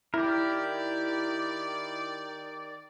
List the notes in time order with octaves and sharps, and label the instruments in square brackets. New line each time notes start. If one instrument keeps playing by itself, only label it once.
[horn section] D#3 D5 [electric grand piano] E4 [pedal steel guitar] G4 A#4